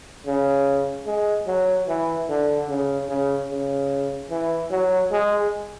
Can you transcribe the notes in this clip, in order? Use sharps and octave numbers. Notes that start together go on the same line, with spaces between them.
C#3
G#3
F#3
E3
D3
C#3
C#3
C#3
E3
F#3
G#3